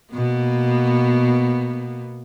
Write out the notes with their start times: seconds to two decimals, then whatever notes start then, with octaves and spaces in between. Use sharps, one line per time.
0.13 B2 A#3 B3